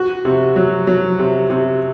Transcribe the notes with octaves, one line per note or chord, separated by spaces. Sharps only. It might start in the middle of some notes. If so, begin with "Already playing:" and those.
Already playing: F#4
C3
F#3
F#3
C3
C3